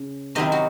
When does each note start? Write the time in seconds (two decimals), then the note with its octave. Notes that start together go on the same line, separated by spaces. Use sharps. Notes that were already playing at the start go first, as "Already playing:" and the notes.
Already playing: C#3
0.35 C3 D#3 F#3 C4 E4 D#5
0.52 F#4